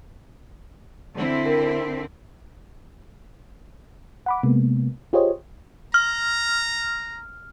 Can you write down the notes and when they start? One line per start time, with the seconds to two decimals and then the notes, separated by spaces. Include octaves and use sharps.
1.15 D3 C4 E4
1.46 A#4
4.26 F#5 B5 D6
4.43 C3 G#3 A#3 B3
5.13 F4 G4 G#4 C5 C#5 D#5
5.94 A#5 F6